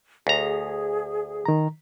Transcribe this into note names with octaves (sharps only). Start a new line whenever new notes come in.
D2 G#4 A#5
D#3 A#5